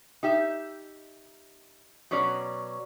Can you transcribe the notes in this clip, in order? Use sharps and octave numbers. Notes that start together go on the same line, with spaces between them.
D#4 G4 E5
B2 F#3 C#4 C#5 D5